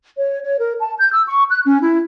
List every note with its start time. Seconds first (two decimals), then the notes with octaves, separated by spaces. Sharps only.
0.17 C#5
0.43 C#5
0.59 A#4
0.80 A5
0.98 G6
1.12 E6
1.28 C#6
1.50 F#6
1.65 C#4
1.81 E4